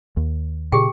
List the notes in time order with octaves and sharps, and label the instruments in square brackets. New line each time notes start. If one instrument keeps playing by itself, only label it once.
[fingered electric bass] D#2
[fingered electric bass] A#2 C#3 [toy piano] G4 G#4 G5